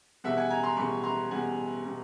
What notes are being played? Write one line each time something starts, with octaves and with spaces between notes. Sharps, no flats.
E2 B2 G3 E5 F#5
F#5 G#5
G#5 A#5
A#5 C6
E2 B2 G3 B5 C#6
A#5 C6
E2 B2 G3 F#5 G#5
B2 G3